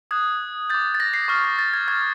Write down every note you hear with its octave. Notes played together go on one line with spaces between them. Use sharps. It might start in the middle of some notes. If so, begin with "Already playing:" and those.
D#6 F#6 G#6
D6 G6 A6
A6
A#6
C7
C#6 F6 A#6
A6
A6
G#6
C#6 F6 G#6